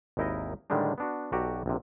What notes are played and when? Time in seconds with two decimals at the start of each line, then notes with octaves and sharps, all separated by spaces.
0.17 G#1 D#2 D#4 E4 A#4 D#5
0.70 A2 D3 D#3 G3 G#3 D4
0.98 B3 D4 F#4
1.32 B1 F#4 G4 A4 D5 A#5
1.66 A#1 C3